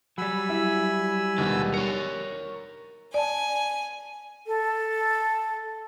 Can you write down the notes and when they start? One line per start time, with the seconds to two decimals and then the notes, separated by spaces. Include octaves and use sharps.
0.18 F#3 G3 G#5 B5 E6
0.49 E4
1.38 D#2 B2 D3 G#3
1.74 A#4 C#5 C#7
3.14 D5 G#5 A5
4.47 A4